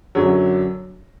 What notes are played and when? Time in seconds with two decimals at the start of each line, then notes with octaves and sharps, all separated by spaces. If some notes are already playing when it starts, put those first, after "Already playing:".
0.15 F#2 D3 F#3